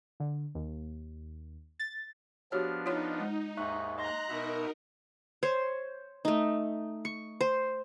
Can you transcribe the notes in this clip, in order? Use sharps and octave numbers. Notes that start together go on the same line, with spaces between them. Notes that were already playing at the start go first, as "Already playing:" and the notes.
D3
D#2
A6
F3 B3 D4 F#4 G4 C#5 F6
D#4 F4 C#5 C6
G#3
D#2 G#2 E5 C#6 F#6
D#5 A#5 C6 F#6 A#6
B2 B3 D#4 A#4 E5
C5 C#5
A3 D#4
C#6
C5